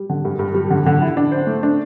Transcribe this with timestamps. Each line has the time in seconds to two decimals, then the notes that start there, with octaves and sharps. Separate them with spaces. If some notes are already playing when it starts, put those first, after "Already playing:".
Already playing: G3
0.10 D3
0.25 G2
0.39 G2
0.54 G3
0.70 D3
0.86 D3
1.02 E4
1.17 D4
1.32 C5
1.47 A3
1.63 D4